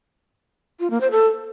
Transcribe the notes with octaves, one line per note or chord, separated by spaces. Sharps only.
F4
A#3
C5
A4